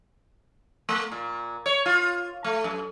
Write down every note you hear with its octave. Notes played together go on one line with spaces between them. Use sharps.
A3
A#2
C#5
F4
A3
F#2